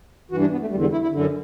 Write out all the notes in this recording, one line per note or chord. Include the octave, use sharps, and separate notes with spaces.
G2 E3 F#4
D4
B3
A3
E2 D3 G3
G3
E4
E4
F#2 D3